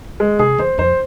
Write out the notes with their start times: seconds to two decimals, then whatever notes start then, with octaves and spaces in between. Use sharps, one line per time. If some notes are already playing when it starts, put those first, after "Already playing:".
0.20 G#3
0.39 C3 G#4
0.58 E2 C5
0.78 F2 C5